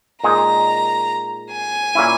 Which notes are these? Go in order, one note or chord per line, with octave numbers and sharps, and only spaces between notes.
A#2 G#3 D#4 G#4 A#5
G#5
A#2 A#3 C#4 E4